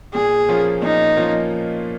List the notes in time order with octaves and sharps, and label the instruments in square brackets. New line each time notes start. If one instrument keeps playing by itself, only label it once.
[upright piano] A#2 [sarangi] G#4
[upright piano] F3 A#3 C#4 F4
[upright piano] A#2 [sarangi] D#4
[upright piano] F3 A#3 C#4 F4